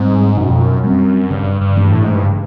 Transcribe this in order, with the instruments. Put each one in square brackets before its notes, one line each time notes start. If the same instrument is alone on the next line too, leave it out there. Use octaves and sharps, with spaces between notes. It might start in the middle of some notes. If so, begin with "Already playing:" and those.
Already playing: [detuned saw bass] G#2 [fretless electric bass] G3 C4
[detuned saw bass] F#2 [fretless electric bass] B2
[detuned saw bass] F2
F#2
[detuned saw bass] F#2 [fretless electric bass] G3 C4
[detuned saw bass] G2 [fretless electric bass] C#3
[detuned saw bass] G2
[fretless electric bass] E3 A3 D4
[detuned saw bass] A2
G#2
G2
[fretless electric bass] C#3